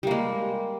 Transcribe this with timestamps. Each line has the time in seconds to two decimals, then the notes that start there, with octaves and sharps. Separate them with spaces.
0.03 G3
0.07 A#3
0.11 G#3